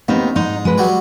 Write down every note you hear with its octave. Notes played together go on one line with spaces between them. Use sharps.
D#2 B3 C4 D#4
G#2 D#4
G#3 B4
F#3 G3